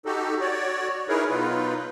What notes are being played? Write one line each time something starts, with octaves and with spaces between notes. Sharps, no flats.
D#4 F#4 G4 A4
F#4 C#5 D5
D#4 E4 G#4 A#4 B4 C#5
B2 F#3 D#4 F4 B4